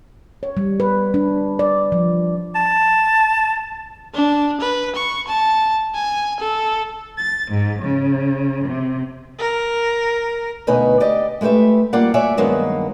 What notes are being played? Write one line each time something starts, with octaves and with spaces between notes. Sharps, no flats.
C#5
G3
B4
D4
D5
F3
A5
D4
B4
C#6
A5
G#5
A4
A6
G#2
C#3
C3
A#4
D2 B2 D#4 B4 C#5 G#5
G4 D5 D#5
G#3 A3 G4 B4 E5
G3 A#3 F4 D5 F#5
F#4 C#5 D5 E5 G#5
G2 D#3 F#3 G#3 A#3 B3